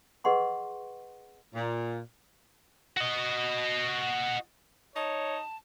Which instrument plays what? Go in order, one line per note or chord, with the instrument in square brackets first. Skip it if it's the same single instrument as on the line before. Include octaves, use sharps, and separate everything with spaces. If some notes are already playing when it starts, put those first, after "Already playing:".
[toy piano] G#4 B4 D#5 F#5 C6 C#6
[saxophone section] A#2
[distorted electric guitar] F#4 D#5
[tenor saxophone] D#4 [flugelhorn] C#5 [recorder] A5